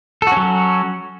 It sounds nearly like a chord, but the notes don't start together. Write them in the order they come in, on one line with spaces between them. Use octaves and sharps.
A4 F#4 C#4 F#3